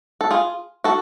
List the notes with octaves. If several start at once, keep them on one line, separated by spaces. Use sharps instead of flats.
A4
F4 G#4
F#4 A4